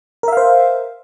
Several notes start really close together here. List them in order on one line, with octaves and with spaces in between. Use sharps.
A#4 E5 F5 C5